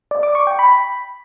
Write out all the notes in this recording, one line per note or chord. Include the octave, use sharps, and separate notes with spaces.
D5
D6
C#6
G5
B5